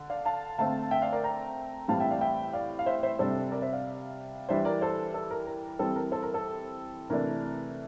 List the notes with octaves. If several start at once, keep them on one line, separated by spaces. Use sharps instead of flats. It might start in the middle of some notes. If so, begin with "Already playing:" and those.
Already playing: D3
D5 F5
F5 A5
D3 A3 C4 F5 A5
E5 G5
D5 F5
A#4 D5
G5 A#5
A2 E3 G3 C4 F5 A5
E5 G5
D5 F5
E5 G5
D5 F5
F5
C5 E5
C5 E5
C3 G3 D4 A4 C5
A#4 D5
C5 E5
D5 F5
E3 G3 D4 C5 E5
A#4 D5
A4 C5
A4
A#4
A#4
E3 G3 C4 A4
A#4
A4 C5
A#4
A4
C3 E3 A3 D4 A#4